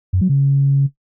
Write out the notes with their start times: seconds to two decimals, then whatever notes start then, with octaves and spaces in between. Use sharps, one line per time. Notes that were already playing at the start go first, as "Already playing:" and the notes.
0.13 F#2
0.21 F#3
0.29 C#3